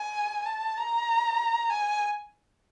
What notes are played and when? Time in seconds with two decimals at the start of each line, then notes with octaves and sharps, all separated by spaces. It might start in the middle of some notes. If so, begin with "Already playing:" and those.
Already playing: G#5
0.46 A5
0.77 A#5
1.70 G#5